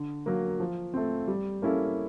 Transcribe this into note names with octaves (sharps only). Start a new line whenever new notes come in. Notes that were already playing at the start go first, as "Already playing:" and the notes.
Already playing: D3
F#3 A#3
F3
A3 C4
G3
A#3 C#4 E4 A4